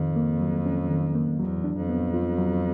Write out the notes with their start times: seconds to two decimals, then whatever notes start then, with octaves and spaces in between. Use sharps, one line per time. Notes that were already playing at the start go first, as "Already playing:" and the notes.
Already playing: F2 D#3
0.16 A#3
0.41 F#3
0.66 C#4
0.90 D#3
1.15 A#3
1.40 E2 F#3
1.64 D4
1.77 F2
1.89 B3
2.14 F4
2.39 F#3